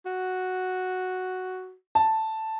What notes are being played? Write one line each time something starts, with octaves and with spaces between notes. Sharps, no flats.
F#4
A5